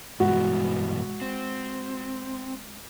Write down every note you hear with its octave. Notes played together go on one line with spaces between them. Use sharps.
G2 B2 E3 G#3 F#4
C4